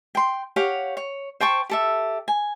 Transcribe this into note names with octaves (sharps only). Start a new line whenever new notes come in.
G5 C6
G4 C#5 F5 F#5
C#5
C5 G5 A5 C#6
G4 A4 E5
G#5